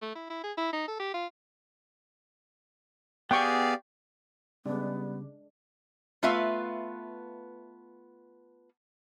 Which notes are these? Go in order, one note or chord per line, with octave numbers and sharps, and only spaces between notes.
A3
E4
E4
G#4
E4
D#4
A4
G4
F4
B3 G4 G#4 D5 F5 G5 C#6
C#3 G3 G#3 B3 D4 D5
A3 B3 F4 B4 E5 F5